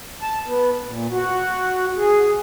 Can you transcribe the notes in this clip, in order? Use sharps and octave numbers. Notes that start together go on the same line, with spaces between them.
A5
B3
A#2
F#4
G#4